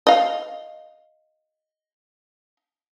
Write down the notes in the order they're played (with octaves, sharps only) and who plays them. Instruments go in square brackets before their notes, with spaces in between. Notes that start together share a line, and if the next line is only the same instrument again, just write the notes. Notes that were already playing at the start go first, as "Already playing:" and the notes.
[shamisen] D#5 F5